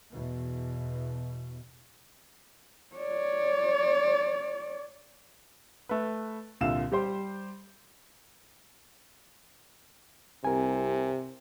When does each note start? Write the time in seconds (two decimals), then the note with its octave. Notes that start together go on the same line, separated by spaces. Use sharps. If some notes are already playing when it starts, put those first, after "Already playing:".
0.13 E2 B2
2.95 C#5 D5
5.89 A3 B4
6.61 C2 A#2 D3 F5 E6 E7
6.92 G3 G4 C5 C6
10.45 C2 C3 A#4 G#5